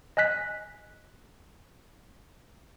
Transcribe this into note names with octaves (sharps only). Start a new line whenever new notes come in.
D#5 G#5 F#6 B6